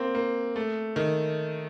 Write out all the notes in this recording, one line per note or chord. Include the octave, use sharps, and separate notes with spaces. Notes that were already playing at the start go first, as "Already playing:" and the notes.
Already playing: A#3 C4
A#3
A3
D#3